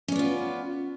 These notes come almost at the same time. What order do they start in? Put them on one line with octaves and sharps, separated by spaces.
C#4 D5 B3 F4